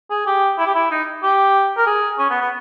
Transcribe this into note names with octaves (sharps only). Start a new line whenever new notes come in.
G#4
G4
E4
G4
E4
D#4
G4
A#4
G#4
C#4
B3
B3